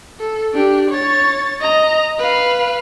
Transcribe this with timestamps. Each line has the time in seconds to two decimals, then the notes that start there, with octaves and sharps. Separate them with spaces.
0.20 A4
0.54 D4 G4
0.91 C#5 A6
1.61 D#5 A#5
2.18 B4 F5